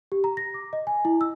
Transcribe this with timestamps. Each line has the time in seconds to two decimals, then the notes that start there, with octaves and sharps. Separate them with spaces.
0.12 G4
0.24 A#5
0.37 A#6
0.54 D6
0.73 D#5
0.87 G#5
1.05 E4
1.21 E6